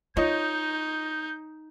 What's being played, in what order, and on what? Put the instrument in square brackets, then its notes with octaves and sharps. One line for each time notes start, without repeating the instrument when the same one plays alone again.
[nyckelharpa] D#4 [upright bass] F4 [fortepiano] C#5 D#5 [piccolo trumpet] G6